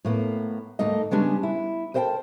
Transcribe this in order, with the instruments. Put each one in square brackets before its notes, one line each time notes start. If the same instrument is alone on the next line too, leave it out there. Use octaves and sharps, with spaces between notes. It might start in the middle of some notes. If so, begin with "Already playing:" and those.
[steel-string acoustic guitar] A2 A#3 B3
D2 G#2 A3 A#3 D#4 D#5
C#3 G3 G#3 B3 C#4 D4
E4
A#4 C5 D#5 F#5 G5 A5